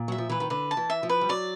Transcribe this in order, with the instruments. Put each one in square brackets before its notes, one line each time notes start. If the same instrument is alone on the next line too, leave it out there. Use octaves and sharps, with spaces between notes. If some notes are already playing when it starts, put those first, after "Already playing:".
Already playing: [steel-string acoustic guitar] A#2
[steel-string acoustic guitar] F#3 [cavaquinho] E5
[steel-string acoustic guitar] F3
[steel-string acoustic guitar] E3 [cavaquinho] B4
[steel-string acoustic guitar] D#3
[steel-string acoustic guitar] D3 [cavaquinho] B4
[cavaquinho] A5
[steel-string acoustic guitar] E3
[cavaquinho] E5
[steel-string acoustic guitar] F3
[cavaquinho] B4
[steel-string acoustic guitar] G3
[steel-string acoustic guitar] F#3 [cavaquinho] D5